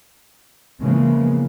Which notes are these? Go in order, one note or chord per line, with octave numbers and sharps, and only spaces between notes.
C#3 E3 F3 G#3 A#3 B3